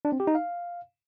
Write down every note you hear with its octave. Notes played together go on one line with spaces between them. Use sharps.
D4
C4
G4
D#4
F5